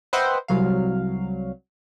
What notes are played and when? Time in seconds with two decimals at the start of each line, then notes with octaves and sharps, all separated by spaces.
0.13 B4 C5 D#5 E5 F#5 G5
0.48 C2 F#3 F5